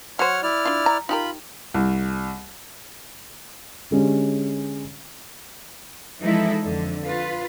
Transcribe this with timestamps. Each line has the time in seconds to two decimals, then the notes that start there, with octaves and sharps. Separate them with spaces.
0.19 F#3 C5 C#5 F#5 F6
0.43 E4 D5 F6
0.65 D4 F4
0.86 A#5
1.09 D#4 F4 G4 A#4 B5
1.74 C2
3.91 D3 G#3 C#4 G4
6.21 E3 F3 G#3 D#4 E4 A4
6.62 F2 D3
7.04 F4 B4